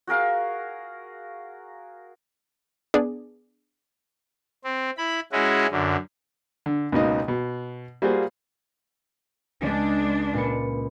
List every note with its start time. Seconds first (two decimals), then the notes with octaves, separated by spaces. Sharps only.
0.07 F#4 G#4 A#4 F5
2.94 B3 D4 G#4 D5
4.64 C4
4.97 E4 B5
5.32 G#3 C#4 E4 F#4
5.71 F#2 D3
6.66 D3
6.92 C#2 B2 A#3 D#4 D#5
7.28 B2
8.02 G3 A#3 F4 F#4 G#4 C5
9.62 C#2 G#3 D4
10.33 A#2 B4 C#7